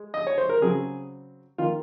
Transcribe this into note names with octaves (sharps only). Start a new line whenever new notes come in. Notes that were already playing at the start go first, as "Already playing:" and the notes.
Already playing: G#3
D#5
C#5
C5
A#4
C#3 F#3 C4 G#4
D#3 A#3 F4